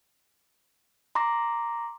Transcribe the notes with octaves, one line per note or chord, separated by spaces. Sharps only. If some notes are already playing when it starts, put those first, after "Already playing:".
A#5 C6 D6 A#6